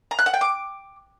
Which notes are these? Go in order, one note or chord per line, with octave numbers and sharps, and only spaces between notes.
A#5
F#6
F#5
G5
D6